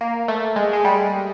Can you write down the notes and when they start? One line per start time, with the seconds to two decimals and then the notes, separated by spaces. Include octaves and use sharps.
0.01 A#3
0.28 A3
0.56 G#3
0.73 G#3
0.85 G3